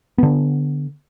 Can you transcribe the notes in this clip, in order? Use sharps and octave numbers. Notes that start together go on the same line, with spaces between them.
D3 B3